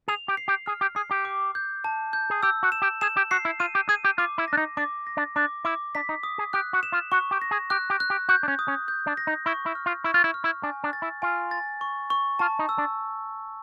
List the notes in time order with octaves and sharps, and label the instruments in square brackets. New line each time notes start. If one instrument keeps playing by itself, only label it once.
[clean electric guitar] G#4 [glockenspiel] F7
[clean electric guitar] G4
[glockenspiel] C7
[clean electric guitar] G4
[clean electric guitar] G#4 [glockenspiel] F6
[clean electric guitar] G4
[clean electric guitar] G#4 [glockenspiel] C7
[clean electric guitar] G4
[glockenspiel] D6
G6
A5
G6
[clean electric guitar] G#4
[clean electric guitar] G4 [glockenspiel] E6
[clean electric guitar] F#4
[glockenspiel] E7
[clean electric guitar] G4
[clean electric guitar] G#4 [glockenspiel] E7
[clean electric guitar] G4
[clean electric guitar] F#4 [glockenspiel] C7
[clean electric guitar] E4
[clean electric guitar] F4 [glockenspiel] D#7
[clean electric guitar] G4
[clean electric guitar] G#4 [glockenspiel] D#7
[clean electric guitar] G4
[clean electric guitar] F4 [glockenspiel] D6
[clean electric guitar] E4
[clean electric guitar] D4 [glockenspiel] A#6
[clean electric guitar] D#4
[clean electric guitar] D4 [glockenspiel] D6
[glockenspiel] A#6
[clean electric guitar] D4
[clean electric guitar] D4 [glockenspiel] D6
[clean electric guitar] E4 [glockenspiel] D6
[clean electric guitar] D4 [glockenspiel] B6
[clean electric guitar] D#4
[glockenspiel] D#6
[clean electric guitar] G#4
[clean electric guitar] G4 [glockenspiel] F#6
[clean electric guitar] F#4
[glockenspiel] E7
[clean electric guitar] F4
[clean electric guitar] F#4 [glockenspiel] C#6
[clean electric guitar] G4
[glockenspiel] A#6
[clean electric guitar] G#4
[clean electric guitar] G4 [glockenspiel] F#6
[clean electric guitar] G4
[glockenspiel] F#6
[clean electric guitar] G4
[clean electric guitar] F#4 [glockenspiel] G6
[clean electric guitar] D4
C#4
[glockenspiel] D#6
[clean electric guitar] C#4
[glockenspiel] G6
[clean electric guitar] D4
[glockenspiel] A#6
[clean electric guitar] D#4
[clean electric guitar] E4 [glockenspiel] C#6
[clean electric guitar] E4
[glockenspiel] F6
[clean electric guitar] F4
[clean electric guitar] E4 [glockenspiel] C#6
[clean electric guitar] F4
E4
[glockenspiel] F6
[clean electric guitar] E4
[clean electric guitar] D4 [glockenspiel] G#5
[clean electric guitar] D4
[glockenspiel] A6
[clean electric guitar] E4
[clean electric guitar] F4 [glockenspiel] G#5
[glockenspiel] A6
C#6
C#6
[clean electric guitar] F4 [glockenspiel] A5
[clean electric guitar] D#4
[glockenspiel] E6
[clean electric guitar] D4